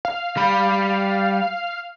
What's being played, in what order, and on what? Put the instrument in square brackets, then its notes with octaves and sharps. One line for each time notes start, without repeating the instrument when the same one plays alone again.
[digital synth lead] F5
[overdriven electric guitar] G3 B5